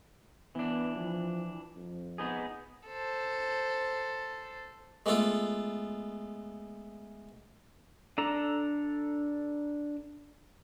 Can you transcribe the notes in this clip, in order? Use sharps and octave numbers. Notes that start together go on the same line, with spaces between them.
E3 B3 D4
F3
F2
B3 D#4 G#4
A4 C5
G#3 A3 B3 F4 A4
D4 A4 A#5